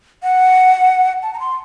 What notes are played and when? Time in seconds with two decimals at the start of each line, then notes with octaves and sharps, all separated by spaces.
0.23 F#5
1.23 A5
1.33 A#5
1.40 C6